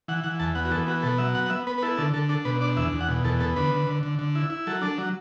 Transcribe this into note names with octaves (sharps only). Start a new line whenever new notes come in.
E3 F#5
E3 F#5
E2 A5
B3 F#5
F#4
E3 A4
B3 F#4
B2 A4
F#3 E5
B3 F#5
F#5
B3 E5
B3 B4
B4
E4 A4
D3 A4
D3 A4
D4 A4
B2 B4
D4 D5
E2 E5
E2
F#5
B2
E2 A4
B3 A4
D3 B4
D3
D3
D3
D3
E4
E4
F#3 A4
D4 A4
F#3